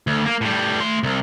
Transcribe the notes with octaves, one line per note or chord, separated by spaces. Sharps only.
D2
A#3
A2 G3
A3 C6
C2